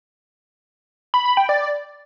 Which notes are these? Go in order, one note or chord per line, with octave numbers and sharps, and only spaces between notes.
B5
B5
G5
D5